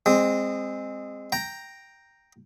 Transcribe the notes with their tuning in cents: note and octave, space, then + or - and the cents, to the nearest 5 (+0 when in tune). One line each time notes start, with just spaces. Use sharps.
G#3 -20 C4 +0
G5 +0 A#5 +0